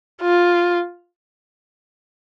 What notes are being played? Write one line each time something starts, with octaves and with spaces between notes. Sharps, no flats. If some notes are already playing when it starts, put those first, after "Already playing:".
F4